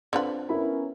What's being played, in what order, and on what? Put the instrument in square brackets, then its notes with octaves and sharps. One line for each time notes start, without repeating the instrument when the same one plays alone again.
[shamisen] D3 F4 B4 [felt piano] C4 D4
[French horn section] B3 C#4 A#4 [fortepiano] E4 B5